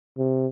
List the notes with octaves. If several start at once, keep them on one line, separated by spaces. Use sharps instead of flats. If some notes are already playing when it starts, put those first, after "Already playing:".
C3